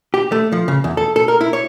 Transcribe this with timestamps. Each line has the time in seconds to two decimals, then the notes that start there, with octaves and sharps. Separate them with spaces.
0.14 G4
0.32 A3
0.52 F3
0.68 C#3
0.84 E2
0.97 A4
1.16 A4
1.28 A#4
1.41 E4
1.53 C#5